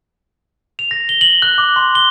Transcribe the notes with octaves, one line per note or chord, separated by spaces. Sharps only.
F7
A#6
G7
F#7
F#6
D6
C6
G7